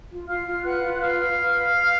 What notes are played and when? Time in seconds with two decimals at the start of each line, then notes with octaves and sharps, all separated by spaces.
0.11 F4
0.28 F4 F5 F6
0.47 F4
0.64 B4 F#5 F#6
0.82 F4
1.01 B4 F5 F6
1.18 B4
1.36 B4
1.54 B4
1.72 B4